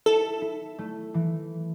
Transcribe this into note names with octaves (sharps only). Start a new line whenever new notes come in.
E4 A4
E4
A3
E3